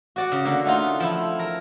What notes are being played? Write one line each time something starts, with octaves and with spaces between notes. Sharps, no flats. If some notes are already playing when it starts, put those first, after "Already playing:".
F#4 D5 F#5
C#3
D3 A#3
A3 D#4 F4
F3 E4
A#4